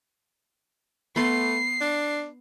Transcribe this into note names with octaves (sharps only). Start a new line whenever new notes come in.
A3 B3 C6 C7
D4